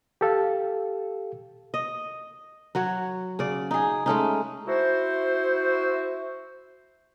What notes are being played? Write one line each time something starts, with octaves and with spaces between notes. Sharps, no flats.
G4 A4 F5
D#5
F#3 F#4 C#5
C#3 D5
D#4 G#4
G#3 A3 C#4 D#4
E4 F#4 C5